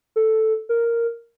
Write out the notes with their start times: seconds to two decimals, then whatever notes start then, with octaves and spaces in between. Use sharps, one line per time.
0.16 A4
0.69 A#4